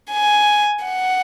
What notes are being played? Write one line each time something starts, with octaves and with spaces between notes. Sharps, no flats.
G#5
F#5